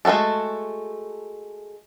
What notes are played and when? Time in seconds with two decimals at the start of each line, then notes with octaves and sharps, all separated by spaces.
0.05 G#3 A3 C#4 F#4 A4